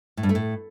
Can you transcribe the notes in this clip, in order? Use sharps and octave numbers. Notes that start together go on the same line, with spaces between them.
A2
G2
A3
A2